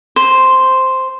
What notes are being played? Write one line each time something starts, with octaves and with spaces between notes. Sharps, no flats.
C5